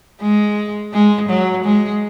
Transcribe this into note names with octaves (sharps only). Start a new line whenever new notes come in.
G#3
G#3
F#3
G#3